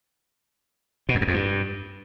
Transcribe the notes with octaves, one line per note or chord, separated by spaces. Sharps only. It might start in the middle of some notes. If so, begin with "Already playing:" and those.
B2
F2
F#2
F2
G2